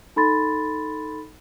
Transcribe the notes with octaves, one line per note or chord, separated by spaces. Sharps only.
D#4 A4 B5 C6 A6